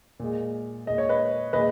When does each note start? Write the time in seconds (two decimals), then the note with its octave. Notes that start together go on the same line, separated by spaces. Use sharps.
0.20 A#2 G#3
0.86 A#2 G#3 D#5
0.98 C#5
1.09 B4 D#5
1.53 A#2 G#3 B4 D#5